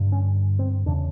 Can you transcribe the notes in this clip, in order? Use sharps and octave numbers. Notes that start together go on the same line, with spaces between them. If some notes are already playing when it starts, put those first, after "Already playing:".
Already playing: G2 D3
C#4
C4
E2 C#3 D4